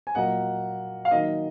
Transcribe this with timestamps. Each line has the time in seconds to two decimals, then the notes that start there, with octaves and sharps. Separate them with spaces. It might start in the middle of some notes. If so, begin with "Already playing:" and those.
0.07 G#5
0.15 A#2 F#3 A#3 D#5 F#5
1.05 F5
1.11 D#3 F#3 A#3 D#5